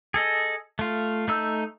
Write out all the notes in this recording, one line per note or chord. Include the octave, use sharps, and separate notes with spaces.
G#4 A4 D#5
A3 F4
A3 D#4 E6